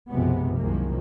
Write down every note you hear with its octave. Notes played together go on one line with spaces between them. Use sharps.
B1 F#2 C3 F3 G#3 B3
C2 F#2 D#3 F3 G#3 A#3